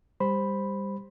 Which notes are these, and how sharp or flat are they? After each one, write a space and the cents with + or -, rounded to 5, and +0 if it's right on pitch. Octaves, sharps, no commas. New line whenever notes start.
G3 +20 C5 +0 B5 +0